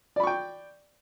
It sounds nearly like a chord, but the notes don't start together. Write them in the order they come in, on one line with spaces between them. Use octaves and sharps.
D5 B5 C#6 G5